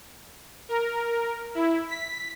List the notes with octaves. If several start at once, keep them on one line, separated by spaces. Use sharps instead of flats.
A#4
E4
B6